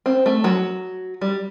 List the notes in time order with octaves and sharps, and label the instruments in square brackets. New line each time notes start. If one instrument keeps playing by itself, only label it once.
[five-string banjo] C4
A3
F#3
G3